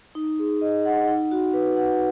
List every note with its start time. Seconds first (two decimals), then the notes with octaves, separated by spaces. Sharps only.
0.15 D#4
0.39 G#4
0.61 D#5
0.85 F#5
1.08 D#4
1.31 F#4
1.54 B4
1.76 F#5